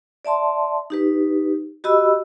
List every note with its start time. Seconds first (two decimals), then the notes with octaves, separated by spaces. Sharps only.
0.25 D5 E5 A5 C6
0.90 D#4 G4 B4
1.84 F#4 G4 D#5 B5 E6